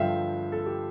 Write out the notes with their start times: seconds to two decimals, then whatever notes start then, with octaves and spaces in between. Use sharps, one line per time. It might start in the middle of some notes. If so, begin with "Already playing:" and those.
Already playing: G2 D3 F3 E5 F5 G5
0.52 A4
0.66 G4